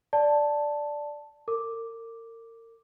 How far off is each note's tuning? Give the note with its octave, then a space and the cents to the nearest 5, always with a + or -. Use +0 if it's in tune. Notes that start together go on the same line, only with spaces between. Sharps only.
D5 +0 A5 +0
A#4 -35 D6 +0